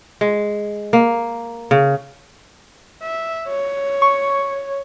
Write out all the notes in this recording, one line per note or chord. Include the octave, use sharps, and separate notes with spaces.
G#3
A#3
C#3
E5
C#5
C#6